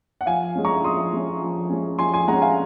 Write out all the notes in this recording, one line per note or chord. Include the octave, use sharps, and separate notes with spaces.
F#5
F3 F5 G#5
G#3 C#4
A#5 C#6
F3 C6 D#6
G#3 C#4
F3
G#3 C#4
F3 G#5 C6
G#5 C6
G#3 C#4 F#5 A#5
F5 G#5